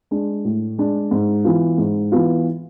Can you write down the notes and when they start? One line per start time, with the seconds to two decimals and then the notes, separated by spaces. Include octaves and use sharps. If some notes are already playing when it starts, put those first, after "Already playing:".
0.11 G#3 D4
0.45 A2
0.78 G#3 D4
1.11 G#2
1.44 E3 B3 F4
1.78 G#2
2.12 E3 B3 F4